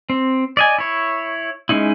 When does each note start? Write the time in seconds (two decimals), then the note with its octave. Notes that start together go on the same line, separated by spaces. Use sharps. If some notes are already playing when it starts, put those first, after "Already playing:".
0.10 C4
0.57 D5 D#5 G#5
0.78 E4 C#5
1.69 G#3 C#4 D#4 E4